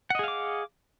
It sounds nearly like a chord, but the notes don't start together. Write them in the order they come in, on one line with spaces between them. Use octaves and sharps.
F#5 D#5 G#4 F5 D6